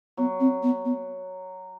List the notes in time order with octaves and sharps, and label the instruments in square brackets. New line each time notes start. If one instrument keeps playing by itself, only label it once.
[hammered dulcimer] F#3 [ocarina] B3
[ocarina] C4
B3
B3